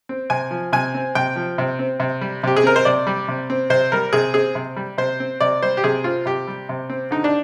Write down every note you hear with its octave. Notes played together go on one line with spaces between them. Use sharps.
C4
C3 G#5
F3
C3 G#5
C4
C3 G5
F3
C3
C4
C3
G3
C3 G4
G#4
C4 A#4
C5
C3 D5
G3
C3
C4
C3 C5
G3 A#4
C3 G#4
C4 G#4
C3
G3
C3 C5
C4
C3 D5
G3 C5
G4
C3 G#4
C4 F4
C3 G4
G3
C3
C4
D3 D#4
D4